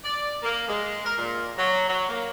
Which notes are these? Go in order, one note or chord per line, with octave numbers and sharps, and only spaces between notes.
D5
A#3
G#3
A#4
A#2
F#3
F#3
A#3